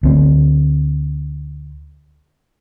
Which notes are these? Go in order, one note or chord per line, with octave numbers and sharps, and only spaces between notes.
D2 C4